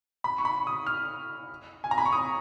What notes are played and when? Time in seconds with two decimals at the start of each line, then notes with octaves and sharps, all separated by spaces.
0.24 B5
0.38 C#6
0.45 B5
0.67 D#6
0.87 F6
1.84 G#5
1.91 A#5
1.98 B5
2.06 C#6
2.13 D#6